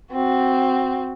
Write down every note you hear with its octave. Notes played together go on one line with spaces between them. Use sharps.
C4 F#4